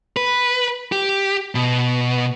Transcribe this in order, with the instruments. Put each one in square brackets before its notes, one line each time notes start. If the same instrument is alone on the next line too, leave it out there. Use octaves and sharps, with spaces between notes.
[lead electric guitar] B4
G4
B2